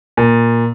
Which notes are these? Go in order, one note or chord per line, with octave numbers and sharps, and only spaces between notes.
A#2